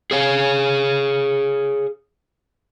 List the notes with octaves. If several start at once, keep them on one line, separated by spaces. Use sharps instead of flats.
G#4 C#5 F5